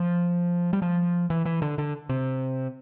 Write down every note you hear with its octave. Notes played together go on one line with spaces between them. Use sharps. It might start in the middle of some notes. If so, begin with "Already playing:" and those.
Already playing: F3
G3
F3
E3
E3
D3
D3
C3